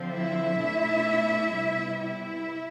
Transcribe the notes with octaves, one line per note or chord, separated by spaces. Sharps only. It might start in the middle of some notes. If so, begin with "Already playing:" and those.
Already playing: D3 F3 C4
E4 E5
B2 A3 D4
C3 G3 B3
E4 E5